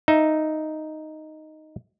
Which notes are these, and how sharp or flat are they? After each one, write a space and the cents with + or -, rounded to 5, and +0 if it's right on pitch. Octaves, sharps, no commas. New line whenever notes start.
D#4 +0 E5 +0